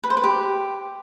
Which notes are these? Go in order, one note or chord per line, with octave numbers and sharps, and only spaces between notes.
B4
C5
B4
G4